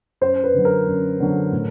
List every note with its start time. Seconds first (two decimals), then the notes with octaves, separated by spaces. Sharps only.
0.21 F#2 C5
0.44 B4
0.54 D3 F#3
0.65 A#4
0.87 F#2
1.20 D3 F#3
1.52 A2